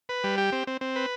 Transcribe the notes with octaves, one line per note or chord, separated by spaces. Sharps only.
B4
G3
G4
C4
C4
C4
B4